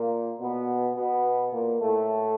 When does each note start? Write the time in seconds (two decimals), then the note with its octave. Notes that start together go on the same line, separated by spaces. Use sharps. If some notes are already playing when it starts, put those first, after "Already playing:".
Already playing: A#2 A#3
0.39 B2 B3
0.95 B2 B3
1.53 A#2 A#3
1.81 A2 A3